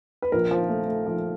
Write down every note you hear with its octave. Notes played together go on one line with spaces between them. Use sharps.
B4
A#1 A#4
F3
A3
A3
F3